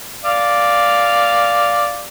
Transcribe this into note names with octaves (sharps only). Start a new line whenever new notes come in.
D5 F5